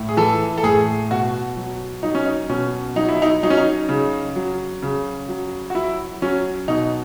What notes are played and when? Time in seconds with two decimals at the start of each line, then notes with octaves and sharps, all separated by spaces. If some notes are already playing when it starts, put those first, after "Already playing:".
Already playing: A2
0.09 G#4
0.17 E3 A4
0.58 A4
0.63 A2 G#4
1.10 B2 F#4
1.57 F#3
2.03 F#3 D#4
2.15 C#4
2.26 D#4
2.49 B2 C#4
2.96 F#3 D#4
3.09 E4
3.22 D#4
3.43 F#3 D#4
3.50 C#4
3.57 D#4
3.89 C#3
4.35 F#3
4.83 C#3
5.29 F#3
5.70 F#4
5.74 F#3 E4
6.22 F#3 C#4
6.68 B2 D#4